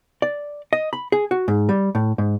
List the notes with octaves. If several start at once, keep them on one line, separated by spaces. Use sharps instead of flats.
D5
D#5
B5
G#4
F#4
G#2
G3
A2
G#2